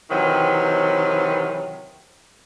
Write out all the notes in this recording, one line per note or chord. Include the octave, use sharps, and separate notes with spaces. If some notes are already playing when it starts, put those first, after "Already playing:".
C3 D#3 E3 F#3